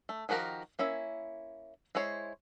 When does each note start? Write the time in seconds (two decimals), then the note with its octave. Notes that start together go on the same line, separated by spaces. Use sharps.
0.09 A3
0.29 D#3 F3 F#4 G4 A#4
0.79 A#3 C#4 E4 E5
1.95 G#3 E4 C5 C#5